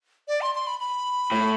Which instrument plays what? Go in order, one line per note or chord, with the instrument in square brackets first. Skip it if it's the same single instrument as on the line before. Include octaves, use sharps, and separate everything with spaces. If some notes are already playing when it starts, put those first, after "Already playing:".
[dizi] D5
C6
C6
B5
B5
[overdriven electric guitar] A2